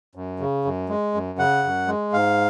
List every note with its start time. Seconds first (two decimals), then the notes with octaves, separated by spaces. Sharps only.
0.15 F#2
0.40 C#3
0.65 F#2
0.89 G#3
1.14 F#2
1.39 C#3 F#5
1.64 F#2
1.87 G#3
2.13 G#2 F5